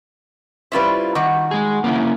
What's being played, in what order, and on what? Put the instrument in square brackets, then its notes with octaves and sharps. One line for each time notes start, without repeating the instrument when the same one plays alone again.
[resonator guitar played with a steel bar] G3 C#4 C5 [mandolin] E4 F4 B4
[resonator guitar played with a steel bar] D#3 G3 [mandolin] F#4 D6
[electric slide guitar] G#3 G#4
A#3 C#4 E4